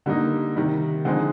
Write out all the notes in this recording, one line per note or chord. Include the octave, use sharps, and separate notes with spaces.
D3 G3 A#3 D#4
C3 D#3 G3
D3 F3 G#3 C4 D#4